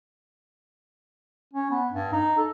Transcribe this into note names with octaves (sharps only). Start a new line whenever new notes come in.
C#4
B3
G2
D#4
A4